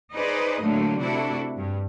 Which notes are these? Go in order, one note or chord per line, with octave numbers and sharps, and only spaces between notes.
D#4 G#4 B4 C5 D5 D#5
A2 D3 F#3 A3 A#3
C3 A3 D4 E4 F#4 A4
G2